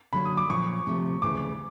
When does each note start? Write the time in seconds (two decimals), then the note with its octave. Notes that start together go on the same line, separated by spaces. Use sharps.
0.13 D3 F#3 A#3 B5
0.25 D#6
0.37 D6
0.49 A#2 F3 A#3 C#4 C#6
0.86 D2 C3 F3 A3
1.22 D2 C#3 E3 D6